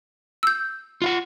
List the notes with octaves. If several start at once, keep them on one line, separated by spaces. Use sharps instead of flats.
E6 G6
F4 F5 F#5